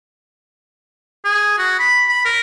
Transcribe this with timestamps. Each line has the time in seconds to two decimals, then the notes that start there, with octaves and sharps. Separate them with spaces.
1.25 G#4
1.58 F#4
1.79 B5
2.09 B5
2.25 A#4